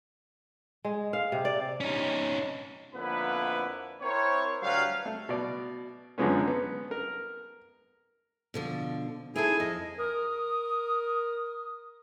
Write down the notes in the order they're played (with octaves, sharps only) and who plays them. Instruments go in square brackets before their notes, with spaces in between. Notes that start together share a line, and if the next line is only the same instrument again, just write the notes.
[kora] G#3
F5
C3
D5
[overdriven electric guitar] C#4 D#4
[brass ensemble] F2 D3 A#3 B3 E4 B4
C4 E4 A#4 C5 C#5
D2 F#3 G3 B4 C#5 F5
[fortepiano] A3
B2 D5
F#2 D3 F3 G#3 B3 C#4
B3
A#4
[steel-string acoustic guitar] B2 D3 F3
[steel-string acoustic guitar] C4 D#4 A4 [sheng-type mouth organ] E4 G#4 G#5
[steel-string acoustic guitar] F2 [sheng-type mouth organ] D#5
[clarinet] A#4 [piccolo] D#6